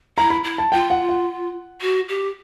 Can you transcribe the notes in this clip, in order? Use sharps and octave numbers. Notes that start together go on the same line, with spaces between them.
E4 A#5
B5
E4
A5
F4 G5
F#5
F#5
F#4
G4